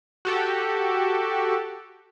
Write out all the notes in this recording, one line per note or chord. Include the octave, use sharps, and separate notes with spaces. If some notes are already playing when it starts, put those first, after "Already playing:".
F#4 G4 A4